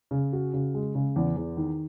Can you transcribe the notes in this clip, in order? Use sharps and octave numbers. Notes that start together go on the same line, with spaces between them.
C#3
F#4
C#3
G#3
C#3
E2
E2
D#3